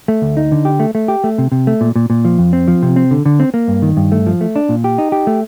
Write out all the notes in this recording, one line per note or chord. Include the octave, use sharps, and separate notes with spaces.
A3
D2
D#4
D3
G4
A3
A3
G4
A3
C3
C3
A3
A#2
A#2
A#2
F3
F2
C4
F3
C3
C4
D3
D3
C4
A#3
G2
D#3
G2
A3
F3
A3
D4
A#2
G4
D#4
G4
A3